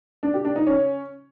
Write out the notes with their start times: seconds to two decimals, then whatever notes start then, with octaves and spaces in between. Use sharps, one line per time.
0.23 D4
0.34 G4
0.45 D4
0.56 D#4
0.67 C#4